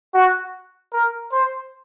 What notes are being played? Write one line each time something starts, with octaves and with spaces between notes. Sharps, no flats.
F#4
A#4
C5